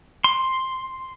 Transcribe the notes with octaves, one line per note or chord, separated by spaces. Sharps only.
C6